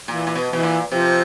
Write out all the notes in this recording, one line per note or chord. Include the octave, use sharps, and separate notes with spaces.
A#2 E3
A#2
B2
B2 E3
A#2
C3 F3